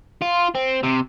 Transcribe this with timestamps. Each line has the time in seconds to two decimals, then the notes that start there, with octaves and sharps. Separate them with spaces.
0.22 F4
0.55 C4
0.83 C3